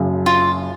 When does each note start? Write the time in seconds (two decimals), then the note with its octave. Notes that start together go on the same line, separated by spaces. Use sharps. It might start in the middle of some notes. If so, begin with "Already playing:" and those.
Already playing: F#1 F#2 C#3
0.26 F4